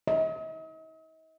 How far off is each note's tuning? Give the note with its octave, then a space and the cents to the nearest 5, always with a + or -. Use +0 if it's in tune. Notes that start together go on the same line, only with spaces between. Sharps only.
D#5 +45